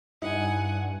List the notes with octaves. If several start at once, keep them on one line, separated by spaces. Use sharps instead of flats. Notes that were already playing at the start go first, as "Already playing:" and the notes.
G2 D#4 E4 F#5 G#5